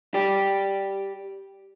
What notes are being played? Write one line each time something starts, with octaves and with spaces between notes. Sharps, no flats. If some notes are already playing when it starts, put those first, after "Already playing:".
G4 D5